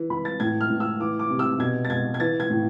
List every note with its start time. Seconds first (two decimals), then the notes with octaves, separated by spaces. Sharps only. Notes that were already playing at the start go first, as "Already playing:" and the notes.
Already playing: E3
0.10 E3 B5
0.25 A6
0.40 A2 G#6
0.61 F6
0.70 A2
0.80 E6
1.00 E3 D6
1.19 D6
1.30 C3
1.39 E6
1.59 B2 G#6
1.85 A6
1.90 B2 G#6
2.14 G#6
2.20 E3 A6
2.40 G#6
2.50 A2